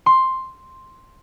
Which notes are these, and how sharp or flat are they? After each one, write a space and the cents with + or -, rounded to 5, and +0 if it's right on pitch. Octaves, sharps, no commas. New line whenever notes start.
C6 +5